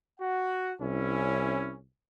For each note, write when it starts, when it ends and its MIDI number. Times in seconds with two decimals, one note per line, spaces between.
0.20 0.73 66
0.20 0.73 78
0.81 1.84 36
0.81 1.76 61
0.81 1.76 64